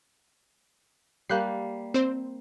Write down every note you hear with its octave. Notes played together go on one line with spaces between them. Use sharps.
G3 A#3 F#6 G6 C7
C4 C5